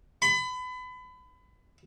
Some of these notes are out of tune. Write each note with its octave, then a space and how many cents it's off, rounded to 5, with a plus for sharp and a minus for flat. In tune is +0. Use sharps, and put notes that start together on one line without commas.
B5 +30